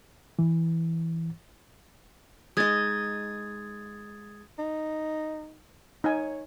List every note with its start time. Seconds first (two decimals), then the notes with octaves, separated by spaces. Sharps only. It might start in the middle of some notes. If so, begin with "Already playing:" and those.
0.39 E3
2.57 G#3 D#4 D#5 D#6 G#6 A6
4.59 D#4
6.04 D#4 C#5 G#5